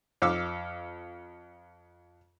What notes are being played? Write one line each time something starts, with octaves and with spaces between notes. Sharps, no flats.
F2 F5 D6 E6